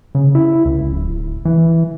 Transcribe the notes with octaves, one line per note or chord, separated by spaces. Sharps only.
C#3
E4
C#2
D1
E3